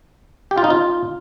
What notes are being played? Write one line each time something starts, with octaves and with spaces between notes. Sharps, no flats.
G4
F4
D#4
F4